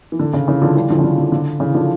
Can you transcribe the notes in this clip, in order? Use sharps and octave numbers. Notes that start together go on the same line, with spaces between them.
E3
D3
C#3
C#3 E3
D3 F3
E3 G3
D3 F3
C#3
D3
D3
D3
C#3 E3
D3 F3